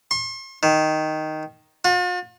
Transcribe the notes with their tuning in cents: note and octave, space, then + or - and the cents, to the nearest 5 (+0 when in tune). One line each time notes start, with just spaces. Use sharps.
C6 +45
D#3 +0
F4 +45